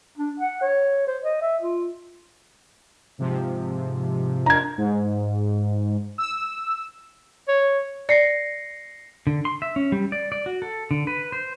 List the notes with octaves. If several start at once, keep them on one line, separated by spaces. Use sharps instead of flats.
D4
F#5
C#5
C5
D#5
E5
F4
G#2 C3 F3
D4 F4 A#4 A#5 G#6
G#2
E6
C#5
D5 A#6 C7 C#7
D3
C6
E5
C#4
G3
D5
D5
F#4
A4
D3
B4
C5